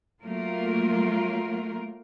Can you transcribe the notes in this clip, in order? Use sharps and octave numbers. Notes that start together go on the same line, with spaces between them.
F#3 A3 A#3 F4 A#4